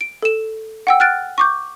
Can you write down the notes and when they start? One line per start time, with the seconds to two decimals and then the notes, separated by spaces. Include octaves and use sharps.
0.01 D7
0.23 A4 E7
0.87 F#5 G5 E6
1.00 F6 F#6 A6 D7
1.38 C#6 D6 G6